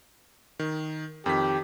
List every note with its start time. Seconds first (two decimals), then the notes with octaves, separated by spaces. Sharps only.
0.59 D#3
1.26 F2 D#3 G4 B6